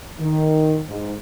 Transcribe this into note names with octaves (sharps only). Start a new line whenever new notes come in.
D#3
G#2